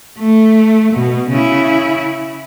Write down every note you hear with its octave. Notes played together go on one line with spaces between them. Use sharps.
A3
B2
C#3 E4